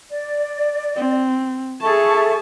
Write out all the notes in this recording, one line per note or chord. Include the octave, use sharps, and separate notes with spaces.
D5
C4
G#4 A4 E5 A5 C#6